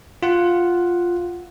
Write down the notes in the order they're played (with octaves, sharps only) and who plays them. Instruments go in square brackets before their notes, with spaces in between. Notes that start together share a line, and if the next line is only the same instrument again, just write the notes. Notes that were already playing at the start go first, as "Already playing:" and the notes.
[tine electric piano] F4 F#5